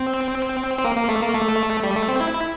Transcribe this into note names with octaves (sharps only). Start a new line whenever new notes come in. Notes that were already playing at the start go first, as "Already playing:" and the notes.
Already playing: C4
C4
A#3
A#3
A3
A#3
A3
G3
A3
C4
E4
E4